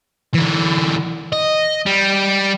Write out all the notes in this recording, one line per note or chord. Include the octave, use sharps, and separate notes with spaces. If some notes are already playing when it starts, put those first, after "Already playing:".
D3 E3
D#5
G3